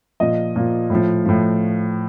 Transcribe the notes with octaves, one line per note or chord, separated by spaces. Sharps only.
A#2 F3 D#5
A#2 F3
A2 F3
A2 F3